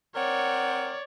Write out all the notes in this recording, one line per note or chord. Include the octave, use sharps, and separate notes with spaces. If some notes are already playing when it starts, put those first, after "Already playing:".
C4 A#4 C#5 D5 F#5